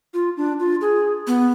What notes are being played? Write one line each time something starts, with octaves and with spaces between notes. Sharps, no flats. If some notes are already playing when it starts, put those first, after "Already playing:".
F4
D4
F4
G#4
B3